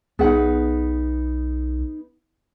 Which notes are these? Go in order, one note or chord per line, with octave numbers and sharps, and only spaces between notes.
B1 B3 D#4 G#4 F#5